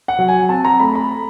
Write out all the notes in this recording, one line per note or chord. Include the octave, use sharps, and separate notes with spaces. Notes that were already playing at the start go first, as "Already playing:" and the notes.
F#5
F#3
G#5
C4 A5
A#5
A3 B5
B5